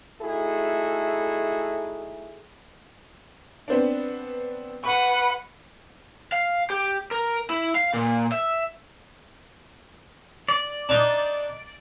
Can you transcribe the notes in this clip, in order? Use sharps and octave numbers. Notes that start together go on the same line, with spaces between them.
A3 D#4 E4 F#4 G#4 A4
B3 C4 D4
B4 F#5 C#6
F5
G4
A#4
E4
F5
A#2
E5
D5
D4 D#4 D#5